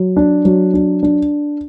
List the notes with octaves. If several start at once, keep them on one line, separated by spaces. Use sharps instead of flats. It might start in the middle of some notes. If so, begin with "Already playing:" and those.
Already playing: F#3
D4
F#3
D4
D4